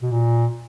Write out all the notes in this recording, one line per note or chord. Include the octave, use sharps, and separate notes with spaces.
B2
A#2